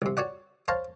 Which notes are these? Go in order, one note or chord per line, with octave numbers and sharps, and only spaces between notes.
C2 C3
F#4 C#5 D5 F#5
C5 C#5 F5 A5 A#5